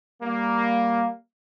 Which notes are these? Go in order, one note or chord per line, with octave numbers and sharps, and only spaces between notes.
G3 A#3